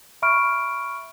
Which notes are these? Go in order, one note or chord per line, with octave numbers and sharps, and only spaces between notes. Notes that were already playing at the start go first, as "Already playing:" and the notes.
E5 B5 C#6 F6 D7